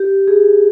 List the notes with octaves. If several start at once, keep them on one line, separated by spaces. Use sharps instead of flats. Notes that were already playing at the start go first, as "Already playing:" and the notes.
Already playing: G4
G#4